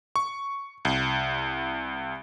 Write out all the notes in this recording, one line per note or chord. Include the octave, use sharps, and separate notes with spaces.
C#6
C2